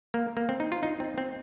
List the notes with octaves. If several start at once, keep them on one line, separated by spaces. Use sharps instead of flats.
A#3
A#3
C4
D#4
F4
D#4
C4
C4